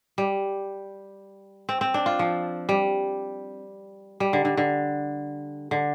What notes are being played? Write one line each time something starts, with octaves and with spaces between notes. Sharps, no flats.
G3
C4
C4
D4
F4
F3
G3
G3
D3
D3
D3
D3